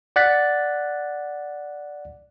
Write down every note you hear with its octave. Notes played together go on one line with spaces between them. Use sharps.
D5 F#5 F#6 A6 B6